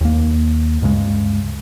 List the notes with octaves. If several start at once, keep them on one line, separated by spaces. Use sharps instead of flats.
D#2 A#3
D2 G2 C#3 G#3